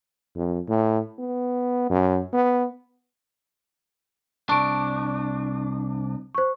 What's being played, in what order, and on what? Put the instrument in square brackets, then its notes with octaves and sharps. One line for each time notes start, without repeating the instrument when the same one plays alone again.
[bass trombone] F2
A2
B3
F#2
B3
[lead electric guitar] C2 D4 [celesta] A5 C#6 D7
[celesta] C5 C#6